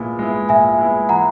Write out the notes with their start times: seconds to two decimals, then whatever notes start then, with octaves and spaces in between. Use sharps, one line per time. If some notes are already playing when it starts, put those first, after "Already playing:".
Already playing: A#2 G#3 B3 E4
0.19 G#3 B3 E4
0.49 A#2 E5 G#5
0.79 G#3 B3 E4
1.09 E3 F#5 A#5